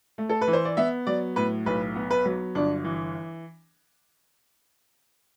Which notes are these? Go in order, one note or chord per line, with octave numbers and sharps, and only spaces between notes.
A3
A4
B4
E3
C5
D5
B3 E5
F#3 D5
A2 B4
B1 B4
B3
B4
F#3
G1 D4
E3